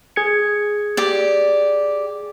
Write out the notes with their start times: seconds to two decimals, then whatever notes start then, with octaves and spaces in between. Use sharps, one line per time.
0.16 G#4 G#6 C#7
0.97 G4 D5